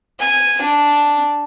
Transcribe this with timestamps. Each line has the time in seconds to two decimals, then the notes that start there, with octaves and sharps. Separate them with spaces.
0.19 G#5
0.62 D4